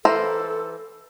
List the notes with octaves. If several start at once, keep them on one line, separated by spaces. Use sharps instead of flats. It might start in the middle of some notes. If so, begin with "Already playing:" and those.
E3 A4 A#4 C5